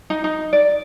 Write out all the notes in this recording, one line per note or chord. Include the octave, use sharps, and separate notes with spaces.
D#4
D#4
D5